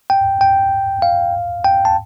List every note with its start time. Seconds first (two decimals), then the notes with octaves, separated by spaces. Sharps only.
0.10 G5
0.41 G5
1.02 F5
1.64 G5
1.85 A5